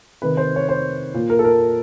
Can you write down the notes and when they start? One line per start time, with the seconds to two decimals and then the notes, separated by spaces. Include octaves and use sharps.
0.22 C3 D#3 B4
0.37 C5
0.56 C#5
0.69 C5
1.14 A#2
1.30 A#4
1.39 A4
1.44 A#4